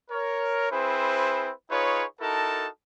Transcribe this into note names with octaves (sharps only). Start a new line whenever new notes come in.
A#4 C#5
C4 E4 G#4 B4 C5
D#4 F4 G#4 B4 C#5
D#4 E4 F#4 A4 A#4 A5